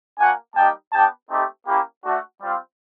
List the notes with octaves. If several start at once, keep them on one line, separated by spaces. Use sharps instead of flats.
A#3 D4 F#4 F#5 G#5
G3 A#3 D#4 G4 G5 A5
B3 D4 G4 G5 A5
A3 C4 D#4 G4
A#3 C#4 E4 G4
A3 D4 F#4
G3 C4 F4